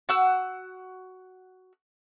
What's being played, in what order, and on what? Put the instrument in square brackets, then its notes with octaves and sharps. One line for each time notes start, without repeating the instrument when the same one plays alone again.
[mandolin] F#4 F#5 E6